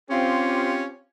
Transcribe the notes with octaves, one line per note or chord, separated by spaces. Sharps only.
C4 C#4 F4 G4